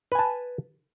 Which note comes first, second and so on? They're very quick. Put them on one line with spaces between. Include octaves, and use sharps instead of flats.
B4 G#5 A5